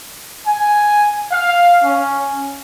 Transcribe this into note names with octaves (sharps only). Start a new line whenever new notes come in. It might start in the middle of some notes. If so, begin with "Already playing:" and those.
G#5
F5
C#4